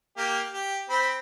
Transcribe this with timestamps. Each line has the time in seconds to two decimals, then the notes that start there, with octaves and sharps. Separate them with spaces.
0.17 A#3 G4
0.53 G4
0.90 C4 B5